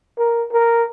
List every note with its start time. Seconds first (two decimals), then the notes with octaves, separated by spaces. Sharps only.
0.18 A#4
0.52 A#4